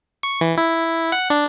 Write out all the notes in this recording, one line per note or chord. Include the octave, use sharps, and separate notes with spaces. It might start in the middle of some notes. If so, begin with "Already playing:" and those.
C#6
E3
E4
F#5
D4